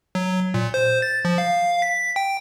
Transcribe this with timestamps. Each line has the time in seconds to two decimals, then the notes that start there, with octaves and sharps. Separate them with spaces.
0.15 F#3
0.54 A#2
0.74 C5
1.02 A6
1.25 F3
1.38 F5
1.82 B6
2.16 G5